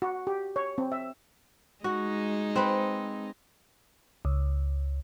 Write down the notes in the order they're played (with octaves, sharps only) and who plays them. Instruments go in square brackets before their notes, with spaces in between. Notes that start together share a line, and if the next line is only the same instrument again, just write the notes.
[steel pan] F#4
G4
C#5
C4
E5
[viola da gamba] G#3 D#4 [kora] F#4
[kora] C4 B4
[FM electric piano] C#2